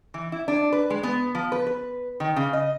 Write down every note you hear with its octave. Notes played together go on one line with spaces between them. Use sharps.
E3
E4
D4
B4
G#3
B3
F3
B4
B4
D#3
C#3
D#5